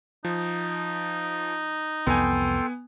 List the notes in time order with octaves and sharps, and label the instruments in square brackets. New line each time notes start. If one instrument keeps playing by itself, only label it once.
[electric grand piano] F3 [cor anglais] D#4
[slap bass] C2 F2 E3 [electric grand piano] B3 G#5 [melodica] A4 G5 C6